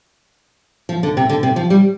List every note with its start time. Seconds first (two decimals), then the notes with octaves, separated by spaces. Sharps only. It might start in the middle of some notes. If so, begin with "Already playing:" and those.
0.89 F3
1.03 D3
1.17 C3
1.29 D3
1.43 C3
1.56 F3
1.70 G3